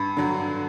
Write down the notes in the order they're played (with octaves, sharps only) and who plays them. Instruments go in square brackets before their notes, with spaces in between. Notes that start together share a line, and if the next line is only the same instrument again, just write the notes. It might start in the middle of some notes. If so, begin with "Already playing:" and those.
Already playing: [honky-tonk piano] G2 [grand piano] B5
[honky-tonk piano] D3 F#3